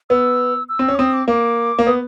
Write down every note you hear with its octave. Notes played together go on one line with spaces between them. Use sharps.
B3 E6
E6
C4
C#4
D6
C4 D#6
D6
A#3 D6
A#3
B3 D#6